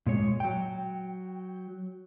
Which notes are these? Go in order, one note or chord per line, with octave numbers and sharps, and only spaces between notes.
A#2 G#3 C#5
F#3 G5